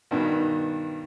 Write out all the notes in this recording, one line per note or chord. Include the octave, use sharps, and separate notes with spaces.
G2 B2 D#3